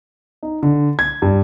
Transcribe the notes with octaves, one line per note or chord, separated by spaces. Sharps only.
D#4
D3
G#6
G2